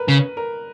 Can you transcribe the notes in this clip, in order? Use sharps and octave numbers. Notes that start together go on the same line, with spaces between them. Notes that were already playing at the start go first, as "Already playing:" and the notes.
Already playing: A#4 B4
C#3
A#4